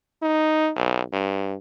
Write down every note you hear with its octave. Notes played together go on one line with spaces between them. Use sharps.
D#4
B1
G2